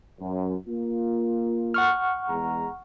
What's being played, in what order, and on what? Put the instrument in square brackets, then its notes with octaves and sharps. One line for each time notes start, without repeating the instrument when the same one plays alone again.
[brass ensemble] F#2
A#3 F4
[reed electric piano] F#5 C#6 F6
[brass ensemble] E2 G#3 A#5